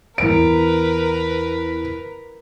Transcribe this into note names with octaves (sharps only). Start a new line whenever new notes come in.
E2 A#4 B4 D7